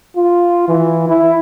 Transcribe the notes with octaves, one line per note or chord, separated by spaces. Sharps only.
F4
E3
E4